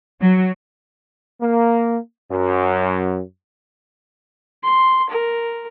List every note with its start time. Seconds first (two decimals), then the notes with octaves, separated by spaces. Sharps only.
0.21 F#3
1.41 A#3
2.31 F#2
4.63 C6
5.10 A#4